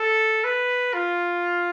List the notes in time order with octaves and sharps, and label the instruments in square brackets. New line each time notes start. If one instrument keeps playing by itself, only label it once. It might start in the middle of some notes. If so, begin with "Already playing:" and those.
Already playing: [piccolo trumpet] A4
B4
F4